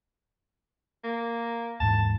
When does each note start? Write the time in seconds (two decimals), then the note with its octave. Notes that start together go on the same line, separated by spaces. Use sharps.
1.04 A#3
1.80 D#2 G#2 E3 A5